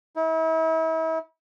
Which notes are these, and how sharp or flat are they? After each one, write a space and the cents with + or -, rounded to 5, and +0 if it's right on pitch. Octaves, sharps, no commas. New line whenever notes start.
E4 -40